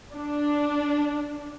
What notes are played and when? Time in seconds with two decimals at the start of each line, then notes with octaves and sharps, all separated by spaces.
0.15 D4